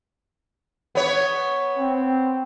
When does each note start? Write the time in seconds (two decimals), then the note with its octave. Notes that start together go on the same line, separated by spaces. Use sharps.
0.95 B3 C#5
1.78 C4